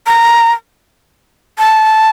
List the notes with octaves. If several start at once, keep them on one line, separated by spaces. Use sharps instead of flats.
A#5
A5